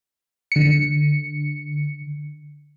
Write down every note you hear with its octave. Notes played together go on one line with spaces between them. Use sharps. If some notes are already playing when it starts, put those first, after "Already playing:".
D3 C#7